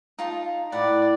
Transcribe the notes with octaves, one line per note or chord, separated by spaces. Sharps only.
D#4 F4 A5
A2 B4 D5 F#5